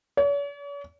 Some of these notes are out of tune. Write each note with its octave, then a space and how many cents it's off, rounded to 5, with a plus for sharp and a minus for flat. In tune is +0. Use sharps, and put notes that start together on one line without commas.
C#5 +45